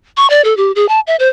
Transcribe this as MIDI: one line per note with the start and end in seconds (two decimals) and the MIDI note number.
0.17 0.29 85
0.30 0.42 74
0.45 0.56 69
0.57 0.72 67
0.75 0.88 68
0.89 1.00 81
1.07 1.16 76
1.19 1.29 72